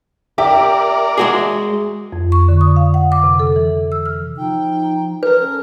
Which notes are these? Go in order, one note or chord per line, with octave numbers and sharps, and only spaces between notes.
G4 A#4 D5 E5
G#3 F#4 G#4
F2
C#6
D3
D#6
F5
F#5
D6
C3
A4
E3
E6
F6
F3 D#4 G5
A#4 B4
C#4 A4